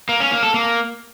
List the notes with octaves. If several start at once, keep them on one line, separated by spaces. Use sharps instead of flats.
A#3
C#4
A#3
A4
A#3